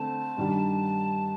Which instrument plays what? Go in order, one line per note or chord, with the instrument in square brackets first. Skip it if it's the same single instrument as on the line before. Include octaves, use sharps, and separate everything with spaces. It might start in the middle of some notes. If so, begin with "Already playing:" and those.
Already playing: [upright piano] D3 A3 C4 [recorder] A5
[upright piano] G2 D#3 G3 D4